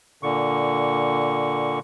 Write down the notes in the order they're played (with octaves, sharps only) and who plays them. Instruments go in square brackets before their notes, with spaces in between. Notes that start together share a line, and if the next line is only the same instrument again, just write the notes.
[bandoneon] A#2 D3 C#6